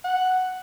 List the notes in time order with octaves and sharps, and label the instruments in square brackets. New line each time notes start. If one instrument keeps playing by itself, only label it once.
[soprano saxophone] F#5